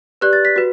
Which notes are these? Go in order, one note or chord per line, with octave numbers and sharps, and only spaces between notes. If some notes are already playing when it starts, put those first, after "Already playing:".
G4 B4 D5 F#6
A6
B6
F#4 B4